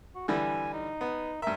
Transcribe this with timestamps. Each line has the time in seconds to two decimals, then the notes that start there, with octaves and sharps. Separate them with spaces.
0.15 F#4
0.28 D3 E3 G3 G#5
0.73 D#4
1.01 B3
1.42 G2 A#4 E5